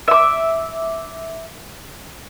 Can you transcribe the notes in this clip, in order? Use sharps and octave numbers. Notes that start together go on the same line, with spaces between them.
E5 D6